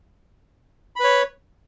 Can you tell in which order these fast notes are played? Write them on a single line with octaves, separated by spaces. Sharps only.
B5 B4 C#5